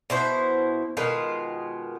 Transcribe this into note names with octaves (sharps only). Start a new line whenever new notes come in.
B2 E4 C5
B2 D#3 G#3 F4